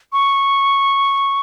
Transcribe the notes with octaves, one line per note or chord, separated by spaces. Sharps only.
C#6